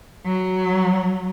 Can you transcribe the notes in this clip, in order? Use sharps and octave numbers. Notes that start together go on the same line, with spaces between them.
F#3